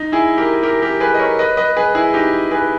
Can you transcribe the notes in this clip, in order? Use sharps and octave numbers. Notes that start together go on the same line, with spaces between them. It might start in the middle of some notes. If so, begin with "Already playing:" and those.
Already playing: D#4
E4 G#4
G4 A#4
G4 A#4
G4 A#4
G#4 B4
D#5
A#4 C#5
B4 D#5
B4 D#5
G#4 B4
E4 G#4
D#4 G4
G#4 B4